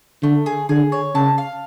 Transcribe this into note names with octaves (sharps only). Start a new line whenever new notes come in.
D3 A3
G#4
D3 G#4
C#5
C#3 A5
F5